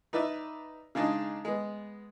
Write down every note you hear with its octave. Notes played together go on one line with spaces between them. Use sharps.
D#4 B4 D5 E5
C#3 G#3 D4 D#4
G#3 B3